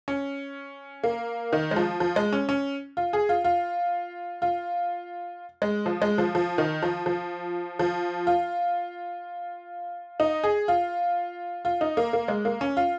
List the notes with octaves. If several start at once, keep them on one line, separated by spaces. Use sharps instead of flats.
C#4
A#3
D#3
G#3
F3
F3
G#3
C#4
C#4
F4
G#4
F4
F4
F4
G#3
F3
G#3
F3
F3
D#3
F3
F3
F3
F4
D#4
G#4
F4
F4
D#4
A#3
A#3
G#3
A#3
C#4
F4